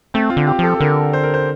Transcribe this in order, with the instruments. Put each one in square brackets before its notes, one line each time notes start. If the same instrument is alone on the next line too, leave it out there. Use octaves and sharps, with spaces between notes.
[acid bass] A3 [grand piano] C4
[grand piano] F4
[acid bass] D3
[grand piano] G4
[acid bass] F3 [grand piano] A4
[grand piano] A4
[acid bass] D3 [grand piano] A#4
[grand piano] C5
A#4
C5